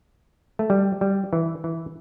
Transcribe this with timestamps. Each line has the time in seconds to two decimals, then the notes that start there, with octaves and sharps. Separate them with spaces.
0.59 A3
0.70 G3
1.01 G3
1.33 E3
1.64 E3